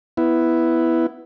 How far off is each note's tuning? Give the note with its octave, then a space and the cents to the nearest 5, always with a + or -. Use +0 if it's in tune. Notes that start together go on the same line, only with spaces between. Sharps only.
B3 +0 E4 +0